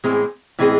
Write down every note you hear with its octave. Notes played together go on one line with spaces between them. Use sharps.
A2 E3 G#3 C4 G#4
A2 E3 G#3 C4 G#4